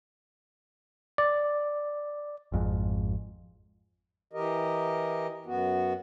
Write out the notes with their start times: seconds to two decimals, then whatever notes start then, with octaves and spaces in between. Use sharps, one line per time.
1.18 D5
2.52 G#1 F2 G#2
4.33 E3 G4 A#4 D#5
5.46 F#2 B3 F#4